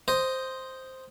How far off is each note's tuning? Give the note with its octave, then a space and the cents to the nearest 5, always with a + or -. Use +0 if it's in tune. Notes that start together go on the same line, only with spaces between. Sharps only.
C5 +0 D#5 +0